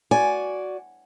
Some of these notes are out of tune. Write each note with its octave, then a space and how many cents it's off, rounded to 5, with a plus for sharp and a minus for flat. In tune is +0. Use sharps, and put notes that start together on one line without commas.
F#4 +0 D5 -10 G#5 +0